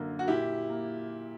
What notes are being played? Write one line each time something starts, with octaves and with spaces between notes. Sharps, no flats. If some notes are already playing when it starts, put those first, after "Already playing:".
Already playing: F#2 D3 A#3
F#4
A#2 E4 G4
A#3